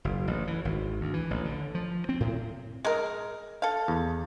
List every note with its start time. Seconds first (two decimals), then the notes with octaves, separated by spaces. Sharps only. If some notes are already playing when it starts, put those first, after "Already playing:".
0.05 F#1
0.27 A1
0.47 E3
0.65 G#1
1.01 D2
1.14 E3
1.31 A1
1.45 D3
1.75 F3
2.09 C4
2.20 A2
2.85 G#3 A#4
3.62 A4 F5
3.88 E2